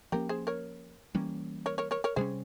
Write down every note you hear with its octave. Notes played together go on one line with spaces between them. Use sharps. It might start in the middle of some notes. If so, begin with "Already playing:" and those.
F3 A#3 C#4 G4 A#4
G#4 C5
A#4 C#5
E3 G3 A#3 C#4
A#4 C#5
A#4 C#5
A#4 C#5
A#4 C#5
C3 G3 A#3 C#4 G#4 C5